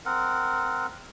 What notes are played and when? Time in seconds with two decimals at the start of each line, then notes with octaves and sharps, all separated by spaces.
0.05 C4 A#4 F#5